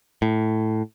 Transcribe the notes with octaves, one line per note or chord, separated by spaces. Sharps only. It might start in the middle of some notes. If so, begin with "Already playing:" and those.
A2